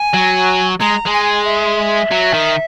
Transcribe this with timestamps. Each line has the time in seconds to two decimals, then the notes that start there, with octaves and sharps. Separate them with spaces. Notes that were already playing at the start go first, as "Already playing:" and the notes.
Already playing: G#5
0.14 F#3
0.80 G#3 A#5
1.06 G#3
1.13 G#5
1.45 E5
2.11 F#3
2.33 D#3